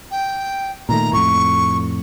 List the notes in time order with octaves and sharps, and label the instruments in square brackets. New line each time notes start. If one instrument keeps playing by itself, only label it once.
[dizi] G5
[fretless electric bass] A#2 D#3 A3 [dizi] A#5
[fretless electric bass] F2 A2 [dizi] C#6